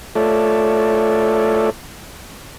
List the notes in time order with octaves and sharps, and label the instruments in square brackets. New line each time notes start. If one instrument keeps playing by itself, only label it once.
[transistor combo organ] A3 F4 A4 C#5 D5 E5